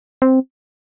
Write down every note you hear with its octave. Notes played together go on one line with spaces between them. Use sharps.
C4